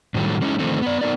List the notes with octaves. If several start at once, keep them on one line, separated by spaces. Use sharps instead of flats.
A2 D#3 F#3 G3 A3
G#3 C#4 D#4 E4
D3 D#3 F3 A3 C4 D#4
B3 D5
B3 D#4 A#4 D5